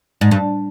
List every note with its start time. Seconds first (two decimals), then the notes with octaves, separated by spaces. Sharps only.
0.21 G#2
0.31 G2